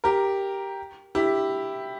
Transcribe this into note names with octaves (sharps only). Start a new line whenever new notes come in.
G4 A#4
E4 G4